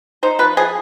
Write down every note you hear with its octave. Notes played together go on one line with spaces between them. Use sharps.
D#4 C5
F3 B4
F3 G#4